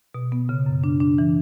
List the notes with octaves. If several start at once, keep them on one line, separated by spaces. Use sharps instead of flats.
B2
B3
C#3
F#2
D4
D4
E3